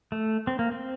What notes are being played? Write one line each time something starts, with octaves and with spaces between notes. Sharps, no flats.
A3
C4
A#3
C4